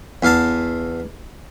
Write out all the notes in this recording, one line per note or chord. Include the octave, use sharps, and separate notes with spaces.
E2 F5 A5